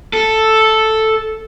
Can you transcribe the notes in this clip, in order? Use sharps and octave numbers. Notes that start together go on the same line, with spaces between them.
A4